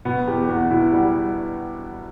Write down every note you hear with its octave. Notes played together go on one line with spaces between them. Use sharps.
B2 B3
E2 G4
E2 F#4
B2 E4
G3 F#4